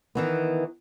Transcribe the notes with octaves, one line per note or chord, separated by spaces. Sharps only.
D#3 E3 B3